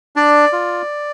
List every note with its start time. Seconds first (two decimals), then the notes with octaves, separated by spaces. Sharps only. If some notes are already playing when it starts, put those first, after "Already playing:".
0.16 D4 D5
0.53 F4